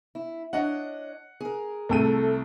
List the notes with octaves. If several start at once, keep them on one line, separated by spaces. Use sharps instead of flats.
E4
D4 C#5 D#5 F#5
G#4 A#4
C2 A3 A4 G5 D#7